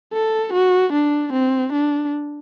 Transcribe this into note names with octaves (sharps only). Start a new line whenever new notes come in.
A4
F#4
D4
C4
D4